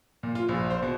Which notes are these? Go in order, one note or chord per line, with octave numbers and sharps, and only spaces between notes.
A#2
F4
A#1
C5
B2